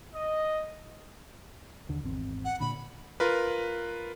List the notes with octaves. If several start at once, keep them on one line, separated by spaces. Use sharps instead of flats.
D#5
D#2 D3
G#1 E2 C4
F#5
A#2 D3 B5
F4 A#4 B4